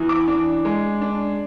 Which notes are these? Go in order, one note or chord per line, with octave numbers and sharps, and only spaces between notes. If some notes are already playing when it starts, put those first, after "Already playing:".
Already playing: E2 E3
D6
D4
G#3
D4